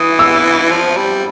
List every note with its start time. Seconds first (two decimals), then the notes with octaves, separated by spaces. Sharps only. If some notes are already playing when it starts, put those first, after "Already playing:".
Already playing: E3 D#6
0.19 E6
0.71 F3
0.97 G3